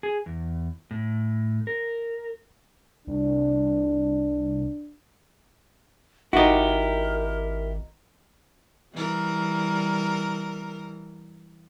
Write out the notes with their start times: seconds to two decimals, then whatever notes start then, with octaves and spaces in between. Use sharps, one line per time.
0.03 G#4
0.26 E2
0.91 A2
1.67 A#4
3.07 C2 D4
6.33 G#1 D#4 E4 F#4 G4 A#4
8.94 E3 G3 A#4